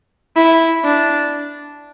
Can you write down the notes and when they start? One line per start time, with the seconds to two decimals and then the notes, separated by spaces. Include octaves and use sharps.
0.36 E4
0.85 D4